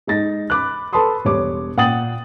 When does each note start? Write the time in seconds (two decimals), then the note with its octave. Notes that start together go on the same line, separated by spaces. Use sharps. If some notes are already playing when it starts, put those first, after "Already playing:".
0.07 G#3 D#4 A6 A#6
0.50 B5 D6 F#6
0.93 A4 B4 A5 B5 C6 D#6
1.25 E1 G3 C#5 D6
1.77 A#2 F#5 G5 D#6 A6 F#7